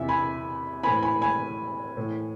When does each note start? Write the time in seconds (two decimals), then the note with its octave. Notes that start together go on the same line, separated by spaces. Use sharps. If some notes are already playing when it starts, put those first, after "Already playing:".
Already playing: E2 C3 E3 E5
0.09 G#5 B5
0.83 A2 E3 G#5 B5
1.03 G#5 B5
1.21 G#5 B5
1.97 A2 E3